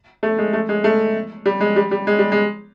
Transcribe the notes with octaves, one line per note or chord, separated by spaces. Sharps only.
A3
G#3
A3
G#3
A3
G3
G#3
G3
G3
G#3
G3
G#3